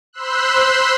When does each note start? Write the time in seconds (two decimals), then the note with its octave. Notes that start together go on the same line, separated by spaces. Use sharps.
0.13 C5 B5 C6 E6 F#6